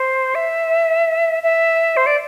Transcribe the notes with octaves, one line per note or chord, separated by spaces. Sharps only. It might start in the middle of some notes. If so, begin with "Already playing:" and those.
Already playing: C5
E5
E5
C5
D5